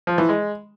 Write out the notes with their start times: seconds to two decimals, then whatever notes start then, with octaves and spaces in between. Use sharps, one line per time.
0.07 F3
0.18 E3
0.29 G#3